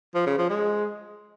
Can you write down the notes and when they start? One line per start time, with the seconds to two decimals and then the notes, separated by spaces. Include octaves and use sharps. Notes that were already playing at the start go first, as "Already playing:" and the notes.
0.15 F3
0.26 C#3
0.38 F3
0.50 G#3